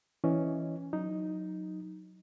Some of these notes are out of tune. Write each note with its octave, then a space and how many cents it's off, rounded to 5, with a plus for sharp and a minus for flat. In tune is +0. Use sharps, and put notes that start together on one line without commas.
E3 +0 C#4 +0 D#5 +0
F#3 -15 D#4 +0